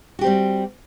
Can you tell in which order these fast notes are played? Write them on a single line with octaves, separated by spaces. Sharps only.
F#4 G4 C4 G3